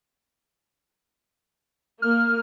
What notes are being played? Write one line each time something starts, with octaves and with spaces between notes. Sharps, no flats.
A#3 F6